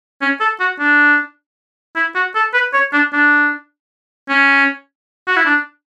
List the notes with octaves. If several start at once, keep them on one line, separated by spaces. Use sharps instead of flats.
C#4
A4
F#4
D4
E4
F#4
A4
B4
C#5
D4
D4
C#4
F#4
E4
D4